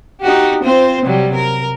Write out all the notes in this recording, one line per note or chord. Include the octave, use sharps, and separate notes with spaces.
D#4 F#4 G4
C4 F4 C5
C3 F#3 G3
A#4